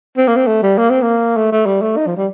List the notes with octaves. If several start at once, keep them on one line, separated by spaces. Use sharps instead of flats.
C4
A#3
C4
A3
G3
A#3
C4
A#3
A3
A3
G3
A3
D#4
F3
G3